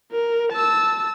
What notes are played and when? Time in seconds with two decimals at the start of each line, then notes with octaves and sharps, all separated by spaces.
0.12 A#4
0.52 A5 E6